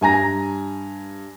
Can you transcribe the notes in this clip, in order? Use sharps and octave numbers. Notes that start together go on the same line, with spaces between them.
G2 G#5 A#5 A#6